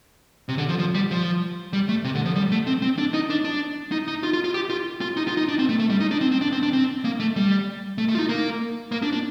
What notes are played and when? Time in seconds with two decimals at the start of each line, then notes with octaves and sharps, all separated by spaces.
0.49 C3
0.58 D3
0.69 F3
0.79 F3
0.95 G3
1.11 F3
1.73 G3
1.89 A3
2.04 C3
2.15 D3
2.25 F3
2.36 G3
2.52 A3
2.67 C4
2.82 C4
2.98 D4
3.14 D#4
3.30 D4
3.45 D4
3.92 D#4
4.08 D#4
4.23 F4
4.33 F4
4.44 F4
4.54 G4
4.70 F4
5.01 F4
5.17 D#4
5.28 F4
5.37 D#4
5.48 D4
5.59 C4
5.69 A3
5.80 A3
5.90 G3
6.00 D#4
6.11 D4
6.21 C4
6.32 C4
6.42 D4
6.53 C4
6.63 D4
6.73 C4
7.05 A#3
7.20 A3
7.36 G3
7.98 A3
8.09 A3
8.15 F4
8.19 D#4
8.29 A#3
8.92 A#3
9.02 D4
9.13 D4